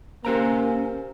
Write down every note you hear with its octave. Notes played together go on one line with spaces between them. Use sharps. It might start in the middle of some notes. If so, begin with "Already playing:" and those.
A#3 C#4 G4 C5 A#5